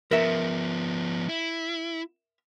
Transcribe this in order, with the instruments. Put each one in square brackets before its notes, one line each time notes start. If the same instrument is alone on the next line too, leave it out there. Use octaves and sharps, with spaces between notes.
[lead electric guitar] F3 B3 [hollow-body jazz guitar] A#4 E5
[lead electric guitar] E4